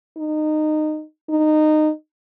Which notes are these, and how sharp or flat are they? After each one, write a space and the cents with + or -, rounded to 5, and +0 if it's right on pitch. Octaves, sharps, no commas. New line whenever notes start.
D#4 -20
D#4 -20